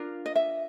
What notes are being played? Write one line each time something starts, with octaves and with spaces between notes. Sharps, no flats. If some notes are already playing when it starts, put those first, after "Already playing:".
Already playing: D4 F4 A#4
D#5
E5